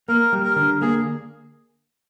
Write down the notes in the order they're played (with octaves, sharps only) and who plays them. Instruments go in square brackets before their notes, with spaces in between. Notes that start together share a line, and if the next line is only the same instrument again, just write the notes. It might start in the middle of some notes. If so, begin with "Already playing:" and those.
[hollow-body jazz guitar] A#3 [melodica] A#4
[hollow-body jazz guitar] G3
[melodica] A#4
[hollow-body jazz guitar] D3
[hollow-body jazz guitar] A#3 [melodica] G#4